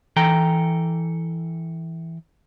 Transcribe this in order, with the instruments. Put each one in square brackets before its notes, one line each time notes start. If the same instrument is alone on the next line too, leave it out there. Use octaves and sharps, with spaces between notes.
[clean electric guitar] E3 A4 G5 A#5